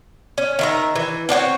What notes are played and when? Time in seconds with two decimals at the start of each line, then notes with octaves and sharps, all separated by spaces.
0.38 C#4
0.59 D#3 E5 A#5
0.96 E3
1.29 C4 D4 F#4 C#5